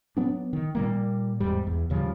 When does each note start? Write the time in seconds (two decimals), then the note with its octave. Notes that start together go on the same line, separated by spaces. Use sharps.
0.17 F#3 B3 D4
0.53 D#3
0.75 A#2 G3 A#3
1.40 E2 G#2 G3
1.67 E2
1.90 D#2 C#3 F3 G3